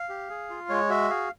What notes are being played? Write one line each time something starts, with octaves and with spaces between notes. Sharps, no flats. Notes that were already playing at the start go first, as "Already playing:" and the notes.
Already playing: F5
G4
G#4
F4
G#3 C#5
F#4 E5
G#4 F5